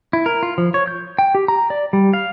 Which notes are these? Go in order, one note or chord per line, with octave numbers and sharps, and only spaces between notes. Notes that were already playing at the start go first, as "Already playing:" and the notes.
E4
A#4
F4
F3
C#5
G6
G5
G4
A#5
D5
G3
F5